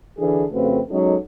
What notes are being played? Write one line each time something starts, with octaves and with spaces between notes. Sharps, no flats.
D3 E3 D4 G#4 A4
F2 C#3 A3 C4 F#4 B4
F#3 G#3 C#4 D#4 A4